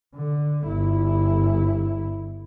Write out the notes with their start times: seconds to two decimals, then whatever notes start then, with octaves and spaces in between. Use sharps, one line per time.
0.15 D3
0.65 G1 E4